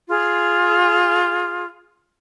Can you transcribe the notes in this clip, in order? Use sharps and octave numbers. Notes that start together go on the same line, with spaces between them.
F4 G#4